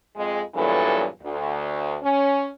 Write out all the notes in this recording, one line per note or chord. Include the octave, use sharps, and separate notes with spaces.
F2 G#3
E2 G2 A#2 E3 F#3 A4
D2
C#4